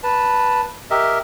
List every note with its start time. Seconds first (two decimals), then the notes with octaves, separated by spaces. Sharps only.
0.03 B4 A5
0.91 G4 A#4 D#5 E5